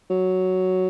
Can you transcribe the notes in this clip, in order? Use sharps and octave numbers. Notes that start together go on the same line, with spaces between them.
F#3